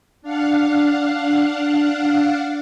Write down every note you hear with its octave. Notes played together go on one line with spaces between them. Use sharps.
D4 F5 F#5